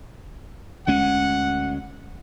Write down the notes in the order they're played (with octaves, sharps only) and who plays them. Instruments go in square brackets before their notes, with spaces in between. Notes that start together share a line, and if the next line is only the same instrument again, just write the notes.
[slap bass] D2 G#3 C#4 [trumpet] F#5